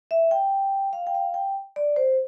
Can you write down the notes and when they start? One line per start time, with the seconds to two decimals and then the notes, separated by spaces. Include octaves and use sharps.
0.11 E5
0.31 G5
0.93 F5
1.07 G5
1.15 F5
1.34 G5
1.76 D5
1.96 C5